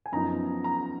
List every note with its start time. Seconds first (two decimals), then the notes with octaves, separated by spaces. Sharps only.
0.06 G#5
0.12 F#2 F3 B3 D#4 A#5
0.64 A#5